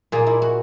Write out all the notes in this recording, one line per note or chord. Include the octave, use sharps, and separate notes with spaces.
A#2 A#3 G#4
E4
F#4